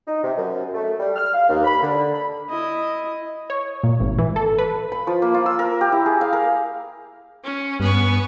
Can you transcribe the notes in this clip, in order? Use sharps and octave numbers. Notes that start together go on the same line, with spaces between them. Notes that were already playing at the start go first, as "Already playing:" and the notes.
D#4
C3
F#2
A3
G3
F6
F5
D#2
B5
D3
B5
E4 D#5
C#5
A#2
G#1
E3
A4
B4
B5
F3
A#3
F4
E6
A#4
G4
E4
G#4
F5
A#4
C#4
G2 B3 G#5 C#6